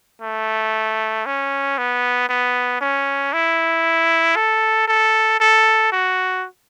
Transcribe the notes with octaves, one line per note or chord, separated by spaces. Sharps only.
A3
C#4
B3
B3
C#4
E4
A4
A4
A4
F#4